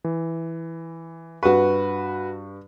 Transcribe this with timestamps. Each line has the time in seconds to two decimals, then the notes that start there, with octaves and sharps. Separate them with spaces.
0.04 E3
1.43 G2 F#4 B4 C#6